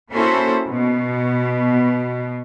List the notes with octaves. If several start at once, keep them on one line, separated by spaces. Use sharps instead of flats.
A#3 C#4 E4 F#4 A4 C5
B2